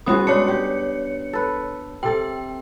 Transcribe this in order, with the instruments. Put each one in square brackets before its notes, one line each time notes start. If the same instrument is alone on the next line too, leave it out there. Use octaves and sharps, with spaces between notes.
[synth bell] G3 C#4 D#6 [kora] B3 F#4 G#4
[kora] G#3 D4 [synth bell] C#5 C#7
[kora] G4
A4 B4
[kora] C3 A4 [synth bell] G5